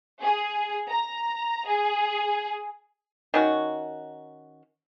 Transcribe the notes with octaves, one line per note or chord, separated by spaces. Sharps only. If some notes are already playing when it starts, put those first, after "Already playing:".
G#4
A#5
G#4
D#3 C#4 F#4